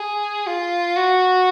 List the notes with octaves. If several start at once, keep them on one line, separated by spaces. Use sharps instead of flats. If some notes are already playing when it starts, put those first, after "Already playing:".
Already playing: G#4
F4
F#4